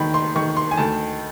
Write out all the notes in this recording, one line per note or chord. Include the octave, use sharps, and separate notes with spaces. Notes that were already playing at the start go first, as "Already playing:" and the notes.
Already playing: D#2 D#3 A#5 B5
C6
D#3 C#6
C6
G#5
D2 A5